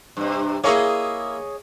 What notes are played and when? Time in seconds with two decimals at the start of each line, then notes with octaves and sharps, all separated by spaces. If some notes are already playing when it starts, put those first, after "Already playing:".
0.17 G2 C3
0.64 A#3 E4 G#4 C#5 D#5